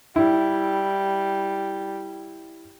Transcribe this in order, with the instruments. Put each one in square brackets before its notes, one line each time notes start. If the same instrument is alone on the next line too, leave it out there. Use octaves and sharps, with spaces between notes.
[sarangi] G3 [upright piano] E4